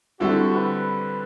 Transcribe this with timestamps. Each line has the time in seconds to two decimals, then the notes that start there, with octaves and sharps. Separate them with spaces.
0.20 D3 G3 C4 E4 F#4 A4
0.55 B4